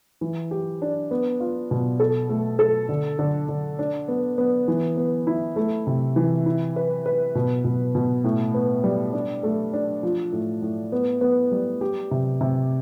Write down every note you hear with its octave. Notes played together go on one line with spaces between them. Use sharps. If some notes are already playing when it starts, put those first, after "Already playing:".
E3
G4
D4
B3
F4
B2
A4
A3
A4
D3
D3
D3
D4
B3
B3
E3
B3
E4
A3
C3
E3
E4
B4
B4
B2
B2
B2
A2
B3
G3
D4
A3
D4
F3
A2
A2
B3
B3
G3
G4
C3
C3